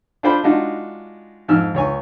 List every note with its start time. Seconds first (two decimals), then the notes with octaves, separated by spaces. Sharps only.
0.23 D4 F4 A4 C5 G5 B5
0.43 G#3 D4 D#4 F4 F#4
1.48 F2 G#2 E6 F6
1.74 C#2 C#5 G#5